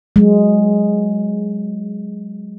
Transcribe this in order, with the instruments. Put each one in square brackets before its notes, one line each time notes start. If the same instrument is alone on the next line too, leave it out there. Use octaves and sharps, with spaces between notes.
[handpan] F#3 G#3